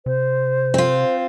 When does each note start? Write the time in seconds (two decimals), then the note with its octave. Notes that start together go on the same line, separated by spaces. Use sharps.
0.06 C3 C5
0.74 C4 F4